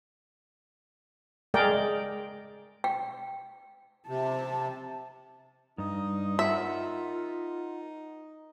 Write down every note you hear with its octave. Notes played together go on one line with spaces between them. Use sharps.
G#3 G#4 A#4 D5 G5
G5
C3 A5
G2 D#4 D#6
F4 A#4 E5 F#5